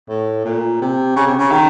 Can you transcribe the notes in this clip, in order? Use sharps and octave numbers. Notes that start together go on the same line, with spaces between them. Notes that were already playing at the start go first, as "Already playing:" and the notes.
A2
A#2
C3
C#3
C3
C#3
D#3